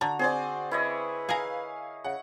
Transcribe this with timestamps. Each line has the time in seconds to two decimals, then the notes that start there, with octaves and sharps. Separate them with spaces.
0.01 D3 D4 F#4 A#5
0.19 C4 G#4 C5 D5
0.71 E4 B4 C#5 D#5
1.29 G#4 A#4 F5 G#5
2.04 C#3 F#5